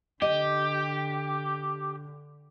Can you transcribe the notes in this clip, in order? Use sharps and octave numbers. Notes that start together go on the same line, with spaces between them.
D3 G4 D#5